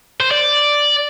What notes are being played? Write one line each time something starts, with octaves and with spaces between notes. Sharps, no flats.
C5
D5